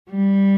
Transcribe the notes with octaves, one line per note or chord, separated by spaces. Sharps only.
G3